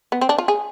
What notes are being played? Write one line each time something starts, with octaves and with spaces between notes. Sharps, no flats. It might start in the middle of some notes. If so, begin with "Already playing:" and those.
B3
C4
D4
F4
G#4